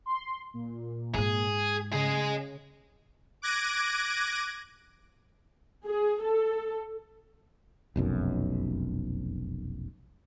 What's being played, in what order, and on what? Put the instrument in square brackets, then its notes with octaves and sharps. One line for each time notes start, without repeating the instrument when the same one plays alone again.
[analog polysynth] C6
A#2
[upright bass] G#2 G#3 [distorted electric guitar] G#4
[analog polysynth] C#3 [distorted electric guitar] G#4 D#5
[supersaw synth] D6 F#6 G#6 A#6 D7 D#7
[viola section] G#4
A4
[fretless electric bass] F1 B1 F#2